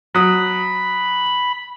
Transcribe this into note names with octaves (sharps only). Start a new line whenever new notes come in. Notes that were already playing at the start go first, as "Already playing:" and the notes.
F#3 B5 D#6